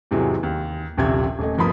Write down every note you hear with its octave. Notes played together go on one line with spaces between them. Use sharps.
E2 G#2 C3 E3 F#3 G#3
D#2
D#1 A#1 D#2 C3 E5 G#6
D#1 A3 D#5
G1 F3 A#3 B5 D#6